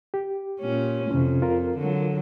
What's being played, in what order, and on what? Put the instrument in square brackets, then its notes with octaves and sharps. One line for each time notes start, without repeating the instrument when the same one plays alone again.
[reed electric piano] G4
[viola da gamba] A#2 C#4
[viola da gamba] F2 [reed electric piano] C3 C#4
[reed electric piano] F4 A#4
[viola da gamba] D3 F#3